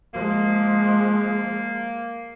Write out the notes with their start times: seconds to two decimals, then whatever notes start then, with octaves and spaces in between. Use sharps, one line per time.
0.14 F3 G#3 A#3